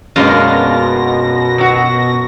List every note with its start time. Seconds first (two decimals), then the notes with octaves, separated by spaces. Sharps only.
0.16 F#2 B2 G#3 A#3 D4 F4 A#6
1.58 F#3 F#4